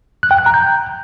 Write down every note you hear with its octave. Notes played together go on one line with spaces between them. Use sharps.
F#6
G5
F#6
A#5
G6